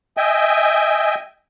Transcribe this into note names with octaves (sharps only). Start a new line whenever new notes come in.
D#5 E5 G5 G#5